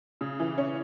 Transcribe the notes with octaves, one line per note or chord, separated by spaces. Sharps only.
C#3
E3
C#4